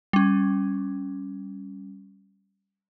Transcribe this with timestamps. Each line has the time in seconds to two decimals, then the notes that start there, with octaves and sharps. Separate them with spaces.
0.13 G3 C#4